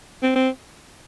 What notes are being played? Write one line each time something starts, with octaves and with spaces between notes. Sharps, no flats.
C4
C4